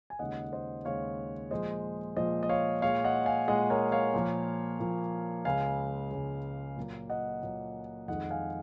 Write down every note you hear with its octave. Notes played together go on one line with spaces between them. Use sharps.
G#5
D#2 C#3 G#3 D#5 F#5
C5 D#5
D#2 C#3 G#3 C#5 F5
A#2 F3 G#3 C5 D#5
A#2 F3 G#3 C5 D#5
D#5
C#5 F5
A#2 G#3 C#5 F5
D#5 F#5
F5 G#5
A#2 G#3 D#5 F#5
A#4 C#5
C#5 F5
A#2 F3 A#3
A#2 F3 A#3
C#2 C#3 G#3 F5 G#5
C#2 C#3 G#3
A#2 F#3 A#3
D#5 F#5
A#2 F#3 A#3
F2 D#3 G#3 D#5 F#5
F5 G#5